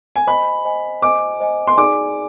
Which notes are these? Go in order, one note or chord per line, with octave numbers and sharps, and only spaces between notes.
G#5
C5 D#5 G#5 B5
C5 D#5 G#5
C5 D#5 G#5 D6
C5 D#5 G#5
C6
D#4 G#4 D5 G#5 D6